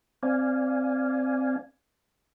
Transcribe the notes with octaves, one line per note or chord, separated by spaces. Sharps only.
C4 D5 F5 G#5